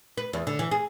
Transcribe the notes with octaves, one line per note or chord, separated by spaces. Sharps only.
B4
E2
D3
E3
G#4